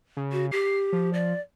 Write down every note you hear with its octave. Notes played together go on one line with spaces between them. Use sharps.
C#3
F#4
G4 C7
F3
D5